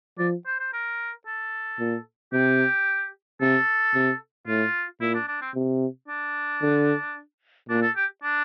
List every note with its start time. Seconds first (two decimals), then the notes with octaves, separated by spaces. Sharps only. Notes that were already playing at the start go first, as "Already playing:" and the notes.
0.19 F3 D5
0.46 C5
0.60 C5
0.73 A#4
1.26 A4
1.79 A#2
2.33 C3 G4
3.41 C3 A4
3.94 C3
4.47 A2 F4
5.01 A#2 E4
5.14 D4
5.28 D4
5.41 C4
5.54 C3
6.08 D4
6.62 D3
7.69 A#2 D4
7.82 A4
7.96 G4
8.23 D4